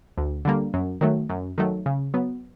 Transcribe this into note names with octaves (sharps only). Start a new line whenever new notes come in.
D2
D3 G3 A#3
F#2
D#3 F#3 A3
F#2
D#3 F#3 A3
C#3
F#3 B3